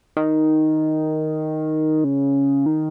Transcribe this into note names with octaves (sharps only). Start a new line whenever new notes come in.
D#3
C#3
D#3